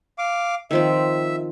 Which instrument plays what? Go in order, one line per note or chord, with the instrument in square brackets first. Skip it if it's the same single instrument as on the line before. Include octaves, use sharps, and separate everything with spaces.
[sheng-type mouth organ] F5 D6
[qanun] D#3 F3 C4 [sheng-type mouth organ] E5